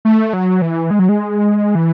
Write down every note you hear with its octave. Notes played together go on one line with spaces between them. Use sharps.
A3
F#3
E3
G#3
F#3
G#3
E3